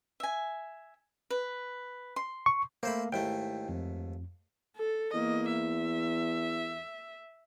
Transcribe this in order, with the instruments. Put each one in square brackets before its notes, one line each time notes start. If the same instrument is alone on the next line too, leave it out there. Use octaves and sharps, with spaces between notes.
[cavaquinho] E5 G#5
B4
C6
[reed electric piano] C#6
[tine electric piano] A3 A#3 [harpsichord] C4 C5 B5
[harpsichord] D#2 G#2 A3 [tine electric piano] E4 G5
[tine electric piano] F2
[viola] A4
[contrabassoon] E2 [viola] A#3 D#5
[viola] E5